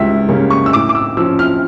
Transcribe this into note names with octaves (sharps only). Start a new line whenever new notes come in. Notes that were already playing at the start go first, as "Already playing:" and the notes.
Already playing: C#2 C#3 G3 C#4 E5
C#3 G3 A#3 C#4
C#6
E6
A2 D6
D6
E6
F3 C#4 E6
F6